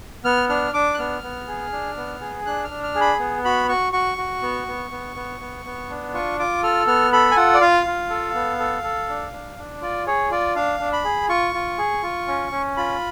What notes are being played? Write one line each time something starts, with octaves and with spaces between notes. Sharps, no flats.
B3 F6
D4 F6
D4 D6
F#6
B3 F6
B3
G#4
D4
B3
G#4
D4 F#6
F6
D4
F6
G#4
B5
B3
F#4 B5
F#4 C#6
F#4 C#6
F#4
B3
B3
B3
B3
B3
B3
D4
F4 C#6
F4 D6
A4 F6
B3 F6
A4 B5
G#5
F4 F#5
D5
F4 F5
F4
A4
B3
A4
A4
D4
D4
D4
F4 D5
G#4 C#5
F4 D5
D4 F5
D4
B5
G#4
F4 C#6
F4
G#4
F4
C#4
C#4
F4 B5